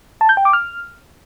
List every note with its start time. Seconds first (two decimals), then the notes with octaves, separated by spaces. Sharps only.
0.21 A5
0.29 G6
0.37 G5
0.45 D6
0.53 F6